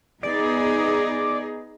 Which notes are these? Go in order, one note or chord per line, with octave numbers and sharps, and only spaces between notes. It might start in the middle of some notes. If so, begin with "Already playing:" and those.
B3 D#4 G#4 D5